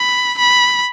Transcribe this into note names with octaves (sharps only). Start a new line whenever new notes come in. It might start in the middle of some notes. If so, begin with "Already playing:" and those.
Already playing: B5
B5